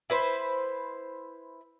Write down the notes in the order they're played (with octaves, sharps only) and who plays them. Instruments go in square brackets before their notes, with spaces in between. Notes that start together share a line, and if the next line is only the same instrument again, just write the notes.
[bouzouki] E4 B4 C5